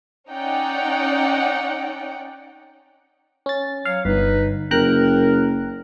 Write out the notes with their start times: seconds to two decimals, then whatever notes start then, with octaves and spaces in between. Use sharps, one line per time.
0.29 C#4 D#4 D5 F#5 G5
3.46 C#4 A6
3.85 F#3 C#5 F5
4.05 G1 D#4 B4
4.71 F#1 A#4 G5 A#5 F#6